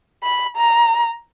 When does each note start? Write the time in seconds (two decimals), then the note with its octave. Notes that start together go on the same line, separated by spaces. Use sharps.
0.23 B5
0.57 A#5